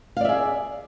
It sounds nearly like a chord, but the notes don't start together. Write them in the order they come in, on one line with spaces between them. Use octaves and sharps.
F5 D5 E5 G#4